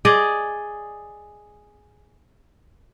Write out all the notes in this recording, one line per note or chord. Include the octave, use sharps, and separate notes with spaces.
G#4 D5 D#5